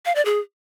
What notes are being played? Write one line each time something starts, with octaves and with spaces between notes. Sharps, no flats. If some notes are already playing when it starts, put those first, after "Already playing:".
F5
D5
G#4